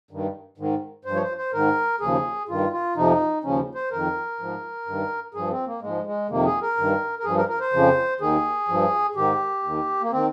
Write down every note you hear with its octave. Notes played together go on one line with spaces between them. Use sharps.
G2 D#3
G#2 D#3
G2 C5
F3
C#5
C5
C5
G#2 D#3 A#4
D#2 C#3 F3 G#4
G2 D#3 F4
F4
F2 C3 F3 D#4
D#2 C#3 F3 C#4
C5
F2 D#3 A#4
G#2 F3
G2 D#3
G2 F3 G#4
C4
A#3
G#2 F3 G#3
G#3
F2 C3 D#3 A#3
G#4
A#4
G2 D#3
A#4
G2 F3 G#4
A#4
A#4
C5
F2 C#3 F3
D#2 D#3 G#4
G2 F3
G#2 D#3 G4
D#2 D#3
A#3
D#3 C4